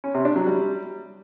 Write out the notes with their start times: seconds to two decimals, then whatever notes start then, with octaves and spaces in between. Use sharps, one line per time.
0.04 C#4
0.14 C3
0.25 D4
0.36 F#3
0.46 G3